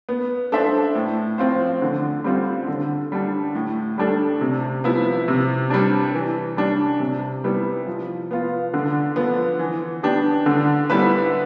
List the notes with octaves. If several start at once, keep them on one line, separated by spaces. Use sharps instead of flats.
B3
D4 A4 C5 E5
A2
F3 C4 F4 C5
D3
G3 C4 F4 C5
D3
G3 D4
A2
G3 D4 A4
C3
F3 B3 E4
C3
G3 D4
E3
G3 D4
C3
G3 B3 E4
F3
B3 F4
D3
F3 B3
E3
B3 D4 G4
D3
G3 B3 E4 B4